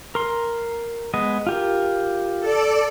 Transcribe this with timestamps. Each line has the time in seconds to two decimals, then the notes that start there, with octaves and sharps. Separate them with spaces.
0.15 A#4 C6
1.14 G#3 B3 D#5
1.47 F4 G4 A#4
2.39 A4 D5